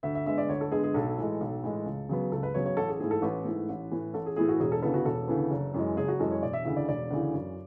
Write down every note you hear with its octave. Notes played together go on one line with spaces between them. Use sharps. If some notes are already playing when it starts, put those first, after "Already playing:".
D2 E5
E5
D3 G#3 B3 E5
D5
D2 C#5
A4
D3 G#3 B3 G#4
G#4
B1 A4
A2 E3 G#3
B1
A2 E3 G#3
C#2
C#3 F#3 B3
C#2 A4
B4
C#3 F#3 B3 C#5
C#5
A1 A4
G#4
G#2 E3 A3 G#4
A4
A1 B4
G#2 E3 A3
A1
A2 E3 A3
A1 A4
G#4
A2 E3 A3 G#4
F#4
E1 G#4
A4
D2 C#3 E3 B3 A4
F#4
E1 A4
D2 C#3 E3 B3
F#1
F#2 E3 G#3
F#1 G#4
F#4
F#2 E3 G#3 A4
C#5
E1 D5
E5
D2 C#3 E3 E5
D5
E1 D5
D2 C#3 E3
F#2